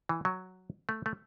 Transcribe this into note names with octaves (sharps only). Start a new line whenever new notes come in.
E3
F#3
A3
A3